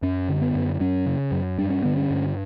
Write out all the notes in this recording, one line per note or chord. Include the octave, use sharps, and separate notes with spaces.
F#2 C#4
D3
B3
F#2
F#2 C#4
C#3
F#2
G2 D4
C#4
D3 B3
C#4
G2